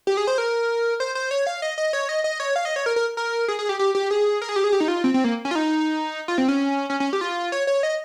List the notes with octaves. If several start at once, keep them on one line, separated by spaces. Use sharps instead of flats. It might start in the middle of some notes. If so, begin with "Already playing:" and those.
G4
G#4
C5
A#4
C5
C5
C#5
F5
D#5
D#5
C#5
D#5
D#5
C#5
F5
D#5
C#5
A#4
A#4
A#4
G#4
G#4
G4
G4
G4
G#4
A#4
G#4
G4
G#4
G4
D#4
F4
C4
C4
A#3
C#4
F4
D#4
F4
C4
C#4
C#4
C#4
G4
F4
C#5
C#5
D#5